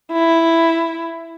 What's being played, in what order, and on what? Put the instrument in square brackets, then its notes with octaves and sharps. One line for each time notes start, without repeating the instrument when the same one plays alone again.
[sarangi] E4